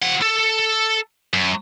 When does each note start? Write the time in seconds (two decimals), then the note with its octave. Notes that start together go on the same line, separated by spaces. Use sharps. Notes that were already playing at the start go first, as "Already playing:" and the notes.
0.03 F3 F#5
0.22 A4
1.34 F#2